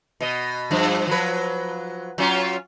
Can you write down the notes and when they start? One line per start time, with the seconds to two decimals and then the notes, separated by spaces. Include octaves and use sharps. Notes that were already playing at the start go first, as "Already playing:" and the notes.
0.21 B2 D#5
0.71 G2 F3
1.07 F3 F#3 B4
2.18 F#3 C#4 F4